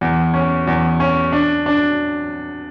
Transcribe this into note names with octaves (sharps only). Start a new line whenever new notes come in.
E2
C#4
E2
C#4
D4
D4